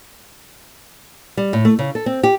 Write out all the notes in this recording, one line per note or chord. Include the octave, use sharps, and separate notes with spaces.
G3
A2
A3
C#3
A4
C4
G4